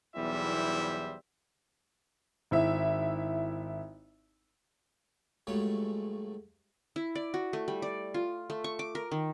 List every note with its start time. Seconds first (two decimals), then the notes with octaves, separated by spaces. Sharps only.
0.15 B1 E2 G3 E4 C5 E5
2.51 G#1 E4 E5
5.47 C#2 G2 F#3 G#3 A3 C#5
6.96 E4
7.15 D5
7.34 F#4
7.53 A3
7.68 G3
7.82 D5
8.14 F4
8.50 A3
8.64 C#6
8.79 D6
8.95 A#4
9.12 D#3